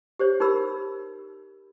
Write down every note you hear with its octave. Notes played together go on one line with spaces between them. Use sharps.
G4 C5 C#5
D#4 G4 A#4 B5 E6